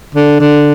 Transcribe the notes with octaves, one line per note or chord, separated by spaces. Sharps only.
D3
D3